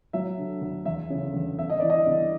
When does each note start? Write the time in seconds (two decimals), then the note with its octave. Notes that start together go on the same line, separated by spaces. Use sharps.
0.13 F#3 E5
0.38 D3
0.61 D2
0.85 E2 E5
1.10 C#3
1.34 E2
1.58 G1 E5
1.70 D#5
1.80 E3 D5
1.90 D#5
2.07 G1